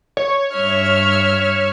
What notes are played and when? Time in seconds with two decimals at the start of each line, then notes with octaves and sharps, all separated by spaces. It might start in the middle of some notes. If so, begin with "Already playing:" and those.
0.17 C#5
0.55 G2 E5 F6